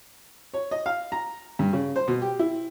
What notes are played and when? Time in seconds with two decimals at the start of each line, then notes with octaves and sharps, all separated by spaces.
0.54 C#5
0.71 D#5
0.86 F5
1.12 A#5
1.59 G2
1.73 C#3
1.96 C5
2.08 B2
2.22 G4
2.39 E4